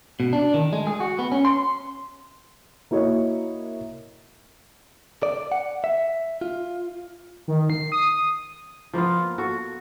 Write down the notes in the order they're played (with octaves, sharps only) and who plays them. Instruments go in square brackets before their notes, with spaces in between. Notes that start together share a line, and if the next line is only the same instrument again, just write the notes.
[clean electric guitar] B2
D4
D#3
G#3
G#4
F#4
B3
C#4
C6
[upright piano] A#3 E4 F#4 C#5 D#5 E5
[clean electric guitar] D5
F#5
E5
F4
[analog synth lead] D#3
C7
D#6
D#6
[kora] F3 A#3 B3 F4
F#4 A4